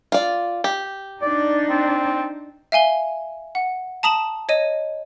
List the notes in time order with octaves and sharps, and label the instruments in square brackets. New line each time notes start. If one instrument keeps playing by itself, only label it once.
[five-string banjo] F4 D5
G4
[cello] D4 D#4 [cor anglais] D5
[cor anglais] C4
[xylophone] E5 F5 G#5 G7
F#5
A5 A#5 D#6 E7 F#7
C#5 D#5 D#7